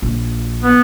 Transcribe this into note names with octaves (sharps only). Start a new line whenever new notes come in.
A#1
B3